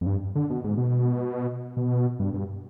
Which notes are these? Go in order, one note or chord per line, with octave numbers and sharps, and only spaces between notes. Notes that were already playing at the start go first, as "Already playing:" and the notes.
F2
G2
D3
B2
G#2
B2
B2
G2
G2